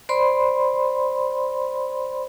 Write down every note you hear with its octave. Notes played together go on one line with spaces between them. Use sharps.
C5 D5 B5 C6